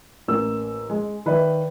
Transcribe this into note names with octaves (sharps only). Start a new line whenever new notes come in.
A1 A#3 E6
G#3
D#3 B4 D5 E5